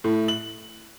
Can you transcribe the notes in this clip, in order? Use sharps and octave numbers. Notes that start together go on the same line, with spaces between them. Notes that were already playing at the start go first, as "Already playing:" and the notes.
A2
F#7